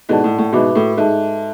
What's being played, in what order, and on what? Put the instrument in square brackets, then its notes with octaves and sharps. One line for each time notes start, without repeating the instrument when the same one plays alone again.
[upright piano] G#2 B2 [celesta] E4 A4 D5 F#5 A5
[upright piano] A2
A2
[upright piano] G#2 B2 [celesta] F#4 B4 E5 B5 D6
[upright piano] A2
[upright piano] G#2 [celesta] A4 E5 A5